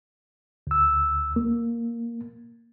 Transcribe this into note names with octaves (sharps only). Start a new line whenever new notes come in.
D2 E6
A#3